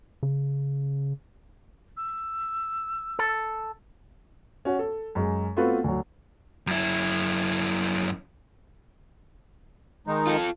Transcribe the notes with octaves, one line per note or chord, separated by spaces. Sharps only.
C#3
E6
A4
C#4 F#4
A4
F#2 G#3
A3 B3 C4 F4 F#4 B4
D2 F#3
F#2 E4
D#3 G#3 D#4
F4 A4